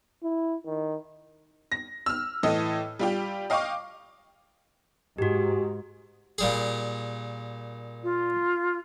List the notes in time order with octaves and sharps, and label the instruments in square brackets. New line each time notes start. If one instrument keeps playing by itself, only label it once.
[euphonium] E4
D#3
[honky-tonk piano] A#6
E6 F6
A2 E3 A4 D#5 E6
G3 F4 G4
D#5 F5 G5 C#6 D6
[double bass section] G#2 [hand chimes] F#4 G4
[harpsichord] A#2 G3 G#4
[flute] F4